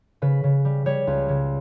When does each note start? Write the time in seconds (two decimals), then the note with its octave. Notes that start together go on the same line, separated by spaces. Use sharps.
0.22 C#3 B4
0.44 C#3
0.65 G3
0.86 G3 C#5
1.07 C#2
1.29 C#3